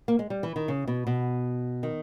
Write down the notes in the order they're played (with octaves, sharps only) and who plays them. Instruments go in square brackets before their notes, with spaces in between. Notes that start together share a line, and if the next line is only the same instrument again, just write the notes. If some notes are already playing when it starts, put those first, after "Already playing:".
[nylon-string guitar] A#3
G#3
G3
E3
D#3
C#3
B2
B2
D#3